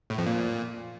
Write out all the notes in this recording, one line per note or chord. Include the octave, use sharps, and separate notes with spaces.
A2
F2
A#2